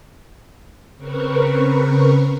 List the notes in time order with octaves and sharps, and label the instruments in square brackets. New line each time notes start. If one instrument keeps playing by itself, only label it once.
[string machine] C#3 C4 A#4 B4 C#6